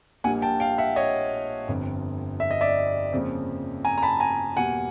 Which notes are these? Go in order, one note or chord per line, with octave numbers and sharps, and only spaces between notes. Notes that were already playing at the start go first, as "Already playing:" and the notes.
A#1 A#2 G3 A#3 D4 F#5 G#5
G5 A5
F5 G5
E5 F#5
C#5 D#5
G1 F2 D3
E5
D#5
D5 E5
F2 C#3 F3 A#3
G#5 A#5
A#5
A5 B5
G#5 A#5
E2 B2 G3 A#3 F#5 G#5